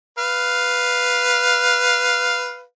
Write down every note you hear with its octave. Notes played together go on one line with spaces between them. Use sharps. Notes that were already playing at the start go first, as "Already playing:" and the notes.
B4 F5